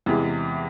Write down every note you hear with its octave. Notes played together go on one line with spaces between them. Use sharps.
E2 C3 E3 G#3 E4